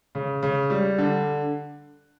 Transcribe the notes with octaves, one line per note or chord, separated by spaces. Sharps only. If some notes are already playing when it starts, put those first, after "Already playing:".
C#3
C#3
G3
D3